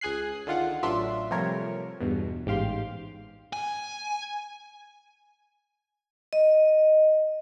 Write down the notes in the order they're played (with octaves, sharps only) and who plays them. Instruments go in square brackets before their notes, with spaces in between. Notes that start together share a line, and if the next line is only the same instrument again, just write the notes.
[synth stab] C#2 G#4 G#5 F#6 C7
D3 D#3 F4 F#5
A1 F#3 D4 F4 E5 C6
C3 F3 G3 A3 A#4 C#5
E2 G2 B2
A1 G#2 G4 F5 C6
[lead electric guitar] G#5
[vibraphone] D#5